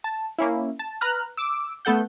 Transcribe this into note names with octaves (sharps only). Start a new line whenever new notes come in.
A5
A#3 C#4 E4
A5
B4 A#5 F6 F#6
D6 E6
A3 B3 A4 F#5 G6